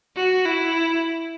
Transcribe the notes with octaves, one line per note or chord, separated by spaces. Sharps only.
F#4
E4